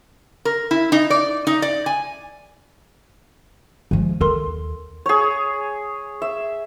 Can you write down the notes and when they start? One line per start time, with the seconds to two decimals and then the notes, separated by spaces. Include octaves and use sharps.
0.45 A#4
0.71 E4
0.92 D#4
1.10 D5
1.47 D#4
1.62 D5
1.86 G#5
3.91 F3 G#3
4.21 D#2 A4 A#4 C6
5.06 G#4 C#5
6.22 E5